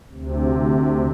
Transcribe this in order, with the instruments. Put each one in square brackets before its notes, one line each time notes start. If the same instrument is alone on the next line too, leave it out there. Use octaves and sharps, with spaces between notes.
[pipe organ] D2 C3